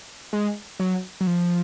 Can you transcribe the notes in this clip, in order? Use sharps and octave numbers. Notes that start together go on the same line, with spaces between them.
G#3
F#3
F#3
F3